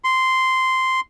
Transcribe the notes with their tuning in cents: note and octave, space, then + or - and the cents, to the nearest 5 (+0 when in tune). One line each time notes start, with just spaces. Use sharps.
C6 -5